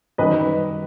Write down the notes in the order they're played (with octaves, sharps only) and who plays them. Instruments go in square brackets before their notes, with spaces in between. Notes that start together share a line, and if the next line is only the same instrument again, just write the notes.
[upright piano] F#2 D#3 G3 B4 D#5